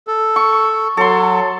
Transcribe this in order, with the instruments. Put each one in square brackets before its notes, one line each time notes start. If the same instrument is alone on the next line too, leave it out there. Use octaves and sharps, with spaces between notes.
[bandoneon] A4
[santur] C#6
[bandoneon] F#3 [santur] A4 C6